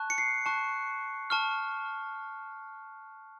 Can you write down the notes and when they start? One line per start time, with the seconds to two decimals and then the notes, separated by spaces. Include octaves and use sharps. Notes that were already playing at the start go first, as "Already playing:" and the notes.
Already playing: A5 C#6 F#6
0.10 C#7
0.18 C7
0.46 A5 C#6 F#6
1.30 A5 C#6 F6